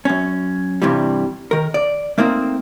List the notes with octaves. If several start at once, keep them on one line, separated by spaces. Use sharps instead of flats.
F#2 C#4
G2 C3 E3 G3
D#3 A#4
D5
A3 A#3 C4 D#4 C5